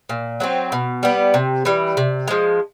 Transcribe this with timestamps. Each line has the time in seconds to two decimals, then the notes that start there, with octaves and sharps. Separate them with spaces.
0.09 A#2
0.40 F#3 A3 C4
0.72 B2
1.03 G3 B3
1.34 C3
1.65 E3 G3
1.97 C3
2.28 F3 G#3